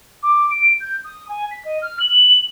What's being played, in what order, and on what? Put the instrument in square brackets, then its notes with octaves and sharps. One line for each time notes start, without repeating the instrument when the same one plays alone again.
[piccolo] D6
D7
G6
D#6
G#5
B6
D#5
F6
F#7